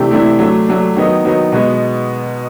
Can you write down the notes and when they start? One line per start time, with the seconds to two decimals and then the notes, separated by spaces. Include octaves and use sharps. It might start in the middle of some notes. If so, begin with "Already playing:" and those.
Already playing: C3 E3 A3 D4 G4
0.11 C3 E3 A3 D4 G4
0.39 F#3 A3 D4
0.67 F#3 A3 D4
0.96 D#3 F#3 B3 D#4
1.24 D#3 F#3 B3 D#4
1.52 B2 G#3 B3